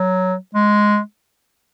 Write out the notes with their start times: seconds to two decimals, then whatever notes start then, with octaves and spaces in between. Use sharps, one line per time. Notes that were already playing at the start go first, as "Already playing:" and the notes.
Already playing: F#3
0.55 G#3